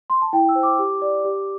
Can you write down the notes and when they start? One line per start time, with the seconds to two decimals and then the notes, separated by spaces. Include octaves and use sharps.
0.10 C6
0.22 A5
0.33 E4 G5
0.49 E6
0.55 C5
0.63 D6
0.79 G4
1.02 D5
1.25 G4